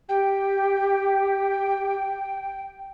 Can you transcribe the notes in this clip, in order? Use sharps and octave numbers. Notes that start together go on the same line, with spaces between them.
G4 G5